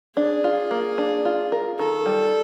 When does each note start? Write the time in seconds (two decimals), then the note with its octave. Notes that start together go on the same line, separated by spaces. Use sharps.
0.16 D4 G#4
0.44 F4
0.71 A#3
0.98 D4
1.25 F4
1.52 A#4
1.78 D#3 A4
2.06 G3